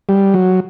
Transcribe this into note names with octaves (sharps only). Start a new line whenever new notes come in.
G3
F#3